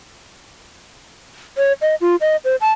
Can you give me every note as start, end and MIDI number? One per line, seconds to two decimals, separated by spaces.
1.58 1.73 73
1.82 1.95 75
2.01 2.16 65
2.21 2.36 75
2.45 2.56 72
2.61 2.72 81